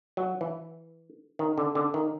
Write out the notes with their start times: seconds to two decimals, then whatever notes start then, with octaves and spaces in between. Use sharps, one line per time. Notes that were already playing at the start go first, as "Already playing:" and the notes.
0.17 F#3
0.41 E3
1.39 D#3
1.58 D3
1.75 D3
1.94 D#3